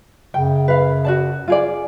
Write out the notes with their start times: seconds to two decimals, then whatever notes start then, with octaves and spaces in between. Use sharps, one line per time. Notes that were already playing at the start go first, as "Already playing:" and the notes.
0.34 F#2 C#3 G5
0.68 B4 F5
1.05 F#4 D5 A5
1.48 F4 G#4 D5